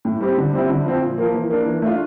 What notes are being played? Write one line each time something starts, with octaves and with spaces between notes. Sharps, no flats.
A2
G3 C4 G4
D3
G3 C4 E4
D3
F3 C4
A#2
F3 A#3
E3
A#3 D4
E3
A3 D4 F4